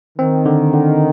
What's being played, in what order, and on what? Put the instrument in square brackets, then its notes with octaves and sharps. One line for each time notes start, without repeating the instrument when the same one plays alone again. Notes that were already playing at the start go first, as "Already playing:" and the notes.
[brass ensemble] D#3 [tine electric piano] C4
[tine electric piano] D3
D3